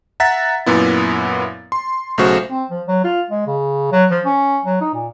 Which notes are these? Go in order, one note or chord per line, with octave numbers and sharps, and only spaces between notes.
E5 F#5 A#5 A6 B6
F#2 A#2 B3 E4
C6
B1 C#3 A3 F#4 C5
C4
F3
F#3
F4
G#3
C#3
F#3
F3
C#4
F#3
D#4
A#2